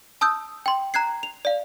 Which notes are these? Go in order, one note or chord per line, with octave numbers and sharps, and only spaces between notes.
A5 D#6 E6 G6
G5 C6
A#5 F#6 G#6 C7
F7
D5 F5